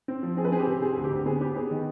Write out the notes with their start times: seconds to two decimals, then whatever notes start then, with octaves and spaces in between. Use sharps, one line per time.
0.08 C4
0.23 F3
0.37 C4 G#4
0.45 B4
0.52 C4 G#4
0.59 G4
0.67 C3
0.82 C4 G#4
0.97 D2
1.04 G4
1.11 D2
1.26 B3 G#4
1.41 B3 G4
1.56 B3 G#4
1.71 D#3